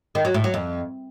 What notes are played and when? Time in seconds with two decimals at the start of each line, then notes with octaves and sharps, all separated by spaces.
0.15 D#3
0.25 F#3
0.34 A2
0.44 F#3
0.54 F2